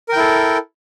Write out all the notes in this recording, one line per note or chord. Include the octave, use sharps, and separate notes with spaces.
E4 A4 A#4 G5